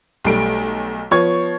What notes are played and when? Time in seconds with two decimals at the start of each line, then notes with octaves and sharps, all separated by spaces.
0.25 B1 G3 A3 D7
1.11 F3 B3 C#5 C#6 G#6